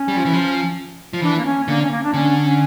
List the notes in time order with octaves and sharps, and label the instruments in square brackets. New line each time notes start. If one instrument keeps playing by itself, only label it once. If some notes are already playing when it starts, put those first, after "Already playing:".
Already playing: [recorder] C#4
[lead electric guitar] G3
F3
E3
F3
F3
[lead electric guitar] E3 [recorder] D4
[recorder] A#3
C#4
[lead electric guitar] D3 [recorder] A#3
[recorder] C#4
A#3
D4
[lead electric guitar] D3 [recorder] C#4
[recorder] C#4